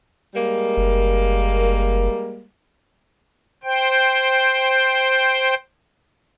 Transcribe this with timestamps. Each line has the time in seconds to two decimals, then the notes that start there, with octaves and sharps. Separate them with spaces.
0.34 G3 G#3 A#3
0.77 F#1
3.64 C5 G5